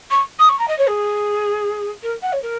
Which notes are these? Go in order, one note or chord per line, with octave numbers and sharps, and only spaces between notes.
C#6
D#6
C#6
A#5
D#5
C#5
G#4
A#4
F#5
C#5
A#4